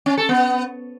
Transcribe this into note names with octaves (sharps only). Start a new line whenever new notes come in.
C#4
A4
B3